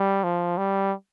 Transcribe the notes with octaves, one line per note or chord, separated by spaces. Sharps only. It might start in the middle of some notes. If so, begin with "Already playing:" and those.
Already playing: G3
F3
G3